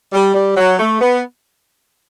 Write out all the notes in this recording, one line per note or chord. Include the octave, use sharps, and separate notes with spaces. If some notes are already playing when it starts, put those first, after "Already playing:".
G3
G3
F#3
A3
B3